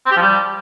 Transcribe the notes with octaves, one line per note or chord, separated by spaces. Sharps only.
C4
G4
F3
G3